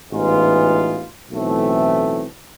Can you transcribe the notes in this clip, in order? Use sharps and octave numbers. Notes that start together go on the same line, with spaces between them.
A1 G#2 E3 B3 F4
B1 A2 E3 A3 C4